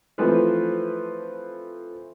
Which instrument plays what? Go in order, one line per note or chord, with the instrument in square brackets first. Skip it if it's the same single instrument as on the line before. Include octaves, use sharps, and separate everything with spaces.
[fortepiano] E3 F3 A3 C4 B4